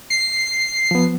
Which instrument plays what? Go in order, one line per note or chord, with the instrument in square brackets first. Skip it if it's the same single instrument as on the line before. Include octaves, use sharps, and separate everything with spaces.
[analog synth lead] C7
[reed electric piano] F3 B3